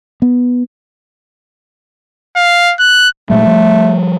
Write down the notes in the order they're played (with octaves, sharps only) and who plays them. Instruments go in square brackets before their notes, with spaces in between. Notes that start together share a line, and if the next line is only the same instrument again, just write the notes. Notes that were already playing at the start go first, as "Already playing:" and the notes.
[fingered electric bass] B3
[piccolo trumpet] F5
F#6
[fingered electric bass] A#2 F#3 G#3 [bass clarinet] A3
[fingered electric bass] F3 G3